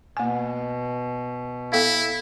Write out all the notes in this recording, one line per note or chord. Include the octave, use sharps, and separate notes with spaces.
B2 A#3 G#5
B3 E4 A4 F5